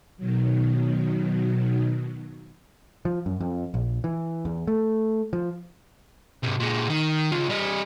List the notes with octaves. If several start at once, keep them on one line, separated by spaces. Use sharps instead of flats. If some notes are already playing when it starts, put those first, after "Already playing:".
B2 D#3 F#3
F3
F#2
F2
A#1
E3
E2
A3
F3
G#2 C3
A#2 G#3
D#3
C#3 F4
G3 D#5